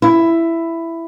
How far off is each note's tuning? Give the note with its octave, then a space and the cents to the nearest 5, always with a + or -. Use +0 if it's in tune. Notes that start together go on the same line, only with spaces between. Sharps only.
E4 +10